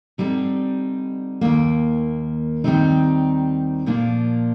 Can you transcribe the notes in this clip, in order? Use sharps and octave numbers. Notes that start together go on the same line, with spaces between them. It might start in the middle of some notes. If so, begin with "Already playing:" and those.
D3 G3 C4 D#4
D#2 D#3 A#3
D#2 D#3 G3 C4 D#4
A#2 F3 A#3 D4 F4